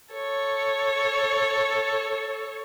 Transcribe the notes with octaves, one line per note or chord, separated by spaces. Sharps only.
A4 C#5